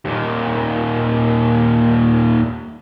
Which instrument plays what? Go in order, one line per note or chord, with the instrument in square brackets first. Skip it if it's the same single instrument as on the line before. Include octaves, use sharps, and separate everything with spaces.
[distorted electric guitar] D#2 A#2